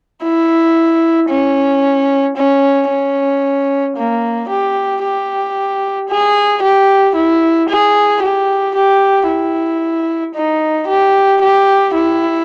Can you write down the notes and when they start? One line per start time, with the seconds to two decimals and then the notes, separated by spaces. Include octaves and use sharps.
0.23 E4
1.30 C#4
2.37 C#4
2.89 C#4
3.97 A#3
4.49 G4
5.03 G4
6.09 G#4
6.62 G4
7.15 E4
7.69 G#4
8.22 G4
8.75 G4
9.29 E4
10.35 D#4
10.88 G4
11.41 G4
11.95 E4